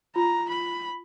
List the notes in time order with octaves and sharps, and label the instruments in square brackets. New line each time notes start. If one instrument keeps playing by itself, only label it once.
[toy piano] F4 [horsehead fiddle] A#5
[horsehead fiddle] B5